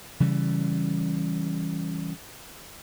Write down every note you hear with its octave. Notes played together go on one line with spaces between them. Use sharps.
C#3 E3 G3